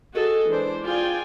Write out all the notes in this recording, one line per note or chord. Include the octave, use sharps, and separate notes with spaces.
F#4 G#4 A4 D#5
E3 G#3 D4 C5
F4 G#4 D5 G5 G#5